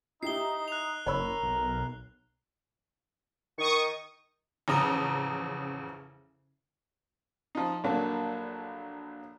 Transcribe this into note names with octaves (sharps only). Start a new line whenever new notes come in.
D#4 E4 G4 E5 C7 G7
F#6 F7
F#1 A#4 C#5 B5 E6
B1
D#3 C#6 D#6
A1 F2 C#3 A#5 D#6
F3 D#4
A#1 D3 F#3 A#3 A5